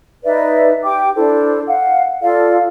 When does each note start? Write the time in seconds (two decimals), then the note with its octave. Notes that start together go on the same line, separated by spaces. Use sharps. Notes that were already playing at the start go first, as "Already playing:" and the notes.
0.24 D#4 B4 D5 E5
0.84 G4 G5 D6
1.16 D4 E4 A4 C5
1.67 F5 F#5
2.21 F4 A4 D5 F5